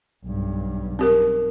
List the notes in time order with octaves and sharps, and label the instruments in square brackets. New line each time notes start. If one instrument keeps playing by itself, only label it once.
[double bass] B1 G2
[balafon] C4 G4 A#4